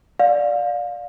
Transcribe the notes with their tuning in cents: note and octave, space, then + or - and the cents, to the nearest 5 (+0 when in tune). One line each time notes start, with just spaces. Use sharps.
D5 +0 F5 +25